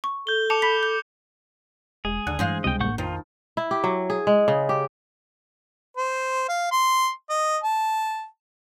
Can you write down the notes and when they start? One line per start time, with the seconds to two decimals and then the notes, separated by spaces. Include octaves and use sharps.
0.04 C#6
0.27 A4 G6 G7
0.50 A5 D6 C#7 F7
0.62 B5 B6
0.83 G6
2.05 E1 G#3 G#4
2.27 D#2 D3 F#5
2.39 G2 E3 G#3 C5 F5 F#5
2.64 C#2 C3 G3 D#5 G5
2.80 A1 A#3 F#5 C#6 G6
2.98 F2 D#3 F3 D#4 F4
3.57 E4
3.71 G4
3.84 F#3
4.10 G#4
4.27 G#3
4.48 C#3
4.69 G4
5.97 C5
6.48 F5
6.72 C6
7.29 D#5
7.63 A5